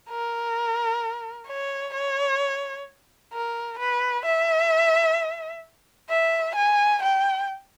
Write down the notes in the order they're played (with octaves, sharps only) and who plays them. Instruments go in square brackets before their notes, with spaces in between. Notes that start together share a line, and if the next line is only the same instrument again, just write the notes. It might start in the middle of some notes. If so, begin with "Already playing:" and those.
[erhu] A#4
C#5
C#5
A#4
B4
E5
E5
G#5
G5